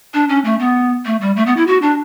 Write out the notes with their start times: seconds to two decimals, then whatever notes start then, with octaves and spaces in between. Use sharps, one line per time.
0.14 D4
0.29 C#4
0.45 A3
0.59 B3
1.06 A3
1.21 G3
1.36 A3
1.46 B3
1.57 E4
1.67 F#4
1.82 D4